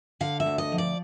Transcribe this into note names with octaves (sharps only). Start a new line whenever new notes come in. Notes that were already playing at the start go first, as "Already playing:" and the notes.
D3 F5
E5
D2
D#5
F3
D5